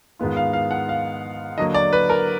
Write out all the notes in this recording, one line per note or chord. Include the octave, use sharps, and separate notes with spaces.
G#2 D#3 G#3 B3 F4
F5
F5
F#5
F5
D3 F#3 A#3 D#5
D5
B4
A#4